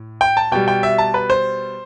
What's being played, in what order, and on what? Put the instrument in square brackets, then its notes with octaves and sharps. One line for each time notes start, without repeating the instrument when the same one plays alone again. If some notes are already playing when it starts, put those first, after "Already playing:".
Already playing: [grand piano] A2
G5
A5
B2 G3 G5
G5
E5
A5
B4
C5